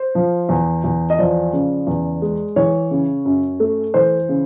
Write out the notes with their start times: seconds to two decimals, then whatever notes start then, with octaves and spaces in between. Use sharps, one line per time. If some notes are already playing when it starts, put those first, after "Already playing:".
Already playing: C5
0.15 F3
0.49 E2
0.84 E2
1.10 D#5
1.19 F3 D5
1.53 C#3
1.87 E2
2.22 G#3
2.56 E3 C#5
2.91 C#3
3.25 F#2
3.60 A3
3.94 E3 C5
4.29 C#3